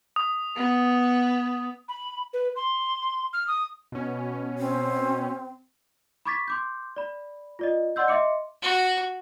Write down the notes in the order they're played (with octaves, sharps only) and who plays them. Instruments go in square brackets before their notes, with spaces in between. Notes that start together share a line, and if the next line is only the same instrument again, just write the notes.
[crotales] D#6
[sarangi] B3
[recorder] B5
B4
C6
F6
D#6
[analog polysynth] B2 C#4
[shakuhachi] C4
[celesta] B5 C#6 D6 G#6 A6 B6
C6 D6 G6
D5 B5
F4 D5 D#5
D5 D#5 F#5 C6 E6 G6
D#5 E5 C6 D6 C#7
[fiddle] F#4